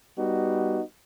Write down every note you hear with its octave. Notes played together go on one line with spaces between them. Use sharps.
G3 B3 D#4 F#4